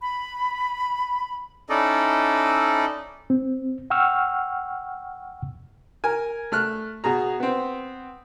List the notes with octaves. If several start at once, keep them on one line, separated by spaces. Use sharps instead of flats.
B5
C#4 D#4 E4 A4 D5 D#5
C4
F#5 G5 C#6 E6 F6
A#4 G#5
A3 F6 F#6
B2 G#4 A#5
B3 C4